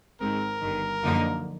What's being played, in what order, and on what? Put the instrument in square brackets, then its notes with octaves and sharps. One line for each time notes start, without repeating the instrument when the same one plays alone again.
[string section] G#1 G#2 D#3 G#3 C4 [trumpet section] A#4
[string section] G1 G2 D#3
F#2 D3 F3 A#3 D#4